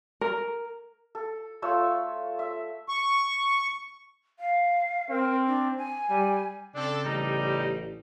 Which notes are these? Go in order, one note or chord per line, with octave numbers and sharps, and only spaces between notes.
A#4
A4
A3 F4 C#5 E6
E5
C#6
F5
C4 A#4
D4
G#5
G3
C#3 C4 D4 A4
A1 G3 D#4